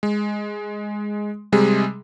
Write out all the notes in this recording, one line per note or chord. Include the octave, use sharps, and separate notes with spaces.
G#3
C3 G3 G#3 G#4